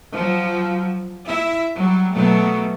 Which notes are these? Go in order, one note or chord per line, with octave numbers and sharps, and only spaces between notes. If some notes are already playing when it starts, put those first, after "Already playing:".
F3 F#3
E4 E5
F#3 G3
B2 F#3 A3